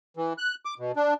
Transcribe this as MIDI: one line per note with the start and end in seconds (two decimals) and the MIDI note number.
0.17 0.33 52
0.38 0.55 90
0.65 0.74 86
0.79 0.92 47
0.96 1.14 62